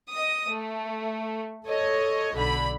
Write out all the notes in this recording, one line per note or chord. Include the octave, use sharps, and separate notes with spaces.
D#5 D#6
A3
A4 C#5 D#5
B1 D3 B5